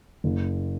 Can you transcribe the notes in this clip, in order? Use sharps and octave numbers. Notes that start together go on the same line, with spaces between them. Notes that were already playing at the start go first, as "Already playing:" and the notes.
F#1